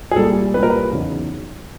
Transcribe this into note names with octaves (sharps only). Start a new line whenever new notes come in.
G#4
C2 A#2 G3 A4
C2 A#2 G3 B4
A#4
B4
E2 C#3 F#3 B3 D#4